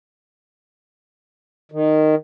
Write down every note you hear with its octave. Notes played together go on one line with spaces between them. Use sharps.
D#3